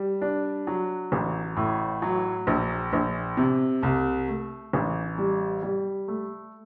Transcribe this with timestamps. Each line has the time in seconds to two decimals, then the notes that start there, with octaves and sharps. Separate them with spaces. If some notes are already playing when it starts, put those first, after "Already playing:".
Already playing: G3
0.21 D4
0.67 F#3
1.12 A1
1.56 A2
2.02 F#3
2.47 A#1
2.93 A#1
3.37 C3
3.83 C2
4.28 A3
4.73 A1
5.18 G3
5.63 G3
6.08 A3